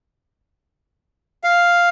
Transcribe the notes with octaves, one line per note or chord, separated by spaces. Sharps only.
F5